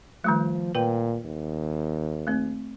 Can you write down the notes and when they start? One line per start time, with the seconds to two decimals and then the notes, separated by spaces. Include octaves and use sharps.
0.24 D#3 F3 G3 A3
0.75 A#2 B4 G5
1.25 D#2
2.27 A3 C4